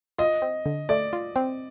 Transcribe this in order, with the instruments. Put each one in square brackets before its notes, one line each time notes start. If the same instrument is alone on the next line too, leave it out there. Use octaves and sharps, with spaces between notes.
[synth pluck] F4 [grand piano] D#5
[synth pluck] C4
D3
[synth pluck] A3 [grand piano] D5
[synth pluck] F4
C4